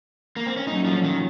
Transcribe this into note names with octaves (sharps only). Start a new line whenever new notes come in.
A#3
C4
C#4
A#2 F#3 A3 C#4 D#4
F3
D#3